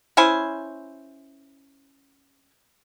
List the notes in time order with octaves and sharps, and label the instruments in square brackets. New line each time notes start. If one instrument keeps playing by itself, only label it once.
[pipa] C#4 E4 C5 G#5